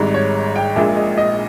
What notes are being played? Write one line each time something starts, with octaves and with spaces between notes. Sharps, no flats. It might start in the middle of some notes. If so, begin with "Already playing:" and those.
Already playing: G#1 G#2 G3
C#5
G5
A#1 A#2 G#3 E5
D#5
D#5